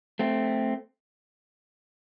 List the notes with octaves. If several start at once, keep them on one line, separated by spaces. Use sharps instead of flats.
A3 C4